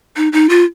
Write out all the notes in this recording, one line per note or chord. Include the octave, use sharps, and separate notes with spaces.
D#4
D#4
F4